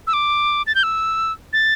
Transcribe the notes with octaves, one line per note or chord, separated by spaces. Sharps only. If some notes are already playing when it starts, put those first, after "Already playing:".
E6
D6
A6
G6
E6
A6